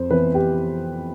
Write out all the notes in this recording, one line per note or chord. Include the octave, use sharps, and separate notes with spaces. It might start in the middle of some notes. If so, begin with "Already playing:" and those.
Already playing: F2 C5
E3 B3 B4
G4